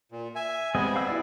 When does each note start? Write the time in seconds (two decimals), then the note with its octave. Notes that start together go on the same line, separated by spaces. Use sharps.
0.12 A#2
0.35 E5 G#5
0.75 G3 G#3 B3 C4 G#4
0.96 F5 B5 E6
1.08 E4 F#4 D5